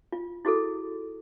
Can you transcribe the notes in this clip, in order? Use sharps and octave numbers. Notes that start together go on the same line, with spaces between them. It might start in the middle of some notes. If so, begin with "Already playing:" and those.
F4
E4 F#4 G#4 A4